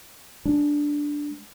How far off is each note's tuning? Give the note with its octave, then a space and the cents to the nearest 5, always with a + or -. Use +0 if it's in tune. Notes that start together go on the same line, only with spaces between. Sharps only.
G#3 +0 D4 +0